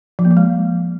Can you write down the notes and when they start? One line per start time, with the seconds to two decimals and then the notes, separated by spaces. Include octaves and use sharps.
0.19 F3
0.25 A#3
0.31 F3
0.37 G#3